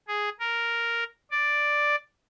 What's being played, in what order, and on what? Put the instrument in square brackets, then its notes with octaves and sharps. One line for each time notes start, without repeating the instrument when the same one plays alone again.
[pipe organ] G#4
A#4
D5